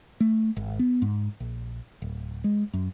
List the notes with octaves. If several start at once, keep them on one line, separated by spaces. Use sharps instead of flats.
A3
G#1
B3
G#2
A#1
D1
G#3
F#2